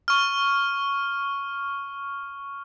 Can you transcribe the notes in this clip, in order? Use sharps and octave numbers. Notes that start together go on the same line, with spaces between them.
C#6 F6